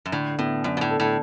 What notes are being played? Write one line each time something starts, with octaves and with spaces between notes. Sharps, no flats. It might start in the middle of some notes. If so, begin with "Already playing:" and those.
F#2
A2 D3
A2 B3
F#2 D4
B2
A2
A4
A2